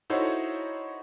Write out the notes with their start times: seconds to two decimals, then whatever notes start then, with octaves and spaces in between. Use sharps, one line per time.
0.10 D#4 E4 F#4 A4 C5 C#5